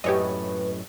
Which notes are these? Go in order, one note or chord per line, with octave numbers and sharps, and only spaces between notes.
F#2 A2 G4 B4 C#5 D#5